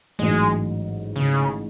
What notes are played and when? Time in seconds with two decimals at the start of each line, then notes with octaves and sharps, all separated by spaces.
0.19 A1 G#2 F#3 G#3
1.16 C#3